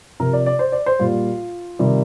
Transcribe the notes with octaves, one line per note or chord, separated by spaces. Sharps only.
C3 F3 A#4
D5
D5
C5
D5
C5
A#2 G3 F4
C3 D#3 G3